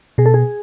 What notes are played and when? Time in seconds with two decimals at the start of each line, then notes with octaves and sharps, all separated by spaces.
0.18 B2 G#4
0.26 A4
0.34 G#4